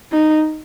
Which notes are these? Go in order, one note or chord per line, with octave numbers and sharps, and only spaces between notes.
D#4